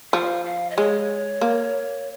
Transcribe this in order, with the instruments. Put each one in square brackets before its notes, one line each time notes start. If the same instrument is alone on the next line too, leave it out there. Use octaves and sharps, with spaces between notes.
[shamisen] F3 [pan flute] F5
[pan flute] F5
D#5
[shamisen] G#3 [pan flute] C#5
[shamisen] A#3